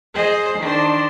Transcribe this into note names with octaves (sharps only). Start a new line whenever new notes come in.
G#4 C5 D#5
D#3 D4 C5